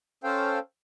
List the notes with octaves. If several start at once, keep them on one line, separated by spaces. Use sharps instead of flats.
C#4 A4 C5 F5 G5